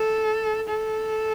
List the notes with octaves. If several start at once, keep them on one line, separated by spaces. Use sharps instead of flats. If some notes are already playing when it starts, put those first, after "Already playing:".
Already playing: A4
A4